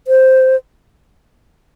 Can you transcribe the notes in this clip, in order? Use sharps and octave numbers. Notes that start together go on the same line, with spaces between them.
C5